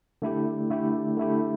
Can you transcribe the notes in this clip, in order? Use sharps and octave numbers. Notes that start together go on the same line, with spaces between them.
D3 A3 E4 G4
D3 A3 E4 G4
D3 A3 E4 G4